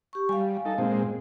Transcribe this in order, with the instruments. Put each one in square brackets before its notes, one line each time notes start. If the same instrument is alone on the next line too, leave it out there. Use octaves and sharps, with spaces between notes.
[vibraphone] G4 C#6
[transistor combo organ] G3 [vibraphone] F5 G#5
[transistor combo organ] D#4 A4
A#2 G#3 C4